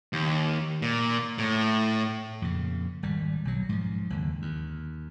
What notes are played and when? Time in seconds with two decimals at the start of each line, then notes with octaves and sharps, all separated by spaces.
0.13 D#2
0.82 A#2
1.38 A2
2.42 F2 A#2 C#3
3.03 G#1 G3
3.45 B1 F#3
3.69 G#2 F3
4.10 F#1 D#2 D3
4.42 D#2